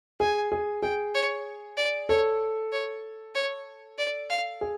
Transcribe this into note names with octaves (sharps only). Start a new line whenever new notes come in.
G#4 G#5
G#4
G#4 G5
C#5
D5
A4 C#5
C#5
C#5
D5
F5
G#4